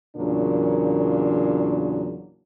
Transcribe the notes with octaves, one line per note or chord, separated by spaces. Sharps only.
E2 A#2 C#3 F#3 A#3 D4